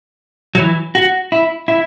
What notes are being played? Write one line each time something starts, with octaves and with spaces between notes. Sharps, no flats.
F#3
E3
F#4
E4
E4